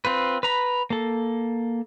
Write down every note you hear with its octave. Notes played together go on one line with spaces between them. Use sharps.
C4 F4 B4
B4 A#5 B5
A#3 A4